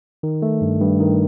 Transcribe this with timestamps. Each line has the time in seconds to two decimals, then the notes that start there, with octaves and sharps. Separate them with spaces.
0.23 D#3
0.42 A3
0.62 G2
0.81 G2
1.00 D#3